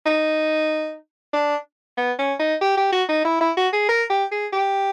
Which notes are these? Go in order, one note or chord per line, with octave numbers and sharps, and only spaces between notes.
D#4
D4
B3
C#4
D#4
G4
G4
F#4
D#4
E4
E4
F#4
G#4
A#4
G4
G#4
G4